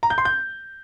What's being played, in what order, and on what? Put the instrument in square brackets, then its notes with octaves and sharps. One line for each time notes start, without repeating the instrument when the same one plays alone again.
[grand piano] A#5
G6
C6
G6